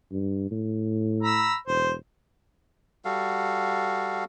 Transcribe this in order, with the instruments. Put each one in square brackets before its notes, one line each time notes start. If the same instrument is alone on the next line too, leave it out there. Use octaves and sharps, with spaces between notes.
[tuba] G2
A2
[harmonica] A#5 B5 E6
[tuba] E1 [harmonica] C5
[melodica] G3 F#4 A4 F5